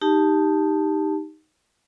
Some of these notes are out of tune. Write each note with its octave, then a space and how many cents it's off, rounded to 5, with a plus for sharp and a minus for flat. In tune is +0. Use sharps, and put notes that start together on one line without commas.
D#4 +0 G4 +0 A5 +0